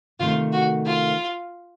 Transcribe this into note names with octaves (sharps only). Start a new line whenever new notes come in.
C3 D#3 A3 F4
F#4
F4